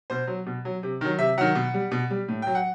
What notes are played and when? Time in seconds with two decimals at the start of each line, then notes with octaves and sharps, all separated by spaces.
0.10 B2 C5
0.27 F#3
0.46 B2
0.65 F#3
0.83 C3
1.01 D#3 F#3
1.19 C3 E5
1.38 D#3 F#3 F#5
1.55 B2
1.74 G3
1.91 B2
2.10 G3
2.28 A2
2.42 F#3 G5
2.55 F#5